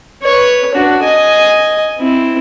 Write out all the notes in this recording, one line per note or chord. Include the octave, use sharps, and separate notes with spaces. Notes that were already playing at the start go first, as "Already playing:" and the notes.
B4 C#5
D4 F#4
D#5 G#5
C4 E4